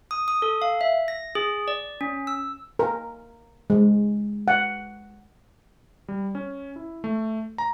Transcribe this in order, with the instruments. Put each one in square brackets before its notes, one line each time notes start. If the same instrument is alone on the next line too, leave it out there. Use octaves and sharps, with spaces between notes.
[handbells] D#6
D#6
A4
F5
E5
A#6
G#4
D5
C#4
E6
[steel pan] A#4
G#3
F#5
[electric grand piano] G3
C#4
E4
A3
A#5